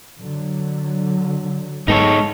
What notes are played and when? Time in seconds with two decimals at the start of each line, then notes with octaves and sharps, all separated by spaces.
0.22 D3 F#3
1.88 G#2 G#3 B3 D#4 A4 C#5